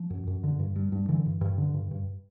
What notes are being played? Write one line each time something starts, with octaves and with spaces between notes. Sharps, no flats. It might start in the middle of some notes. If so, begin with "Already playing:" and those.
Already playing: F3
F#2
F#2
D3
G2
G2
G2
D3 E3
G2
G2
D3
G2
G2